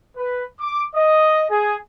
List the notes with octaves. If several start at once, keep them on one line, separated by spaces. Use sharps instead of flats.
B4
D6
D#5
G#4